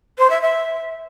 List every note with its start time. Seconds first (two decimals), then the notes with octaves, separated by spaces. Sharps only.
0.19 C5
0.30 E5
0.42 E5